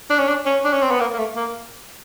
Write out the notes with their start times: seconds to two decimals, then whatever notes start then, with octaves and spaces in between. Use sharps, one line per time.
0.10 D4
0.19 C#4
0.28 D4
0.46 C#4
0.65 D4
0.73 C#4
0.82 C4
0.92 B3
1.00 A#3
1.14 A#3
1.19 A3
1.36 A#3